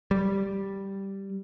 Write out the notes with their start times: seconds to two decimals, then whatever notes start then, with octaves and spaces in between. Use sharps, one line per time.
0.11 G3